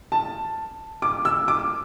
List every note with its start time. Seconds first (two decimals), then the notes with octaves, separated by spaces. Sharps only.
0.12 A5
1.02 D6
1.25 E6
1.48 D6